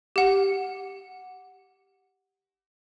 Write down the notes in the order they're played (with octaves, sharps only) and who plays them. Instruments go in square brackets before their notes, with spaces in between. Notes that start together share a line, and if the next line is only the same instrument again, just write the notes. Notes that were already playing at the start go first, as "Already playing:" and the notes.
[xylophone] G4 F#5